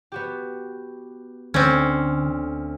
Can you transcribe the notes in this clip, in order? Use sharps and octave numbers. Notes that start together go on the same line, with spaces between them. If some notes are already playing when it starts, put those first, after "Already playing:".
B3 F#4 G4
D2 D3 C4 C#4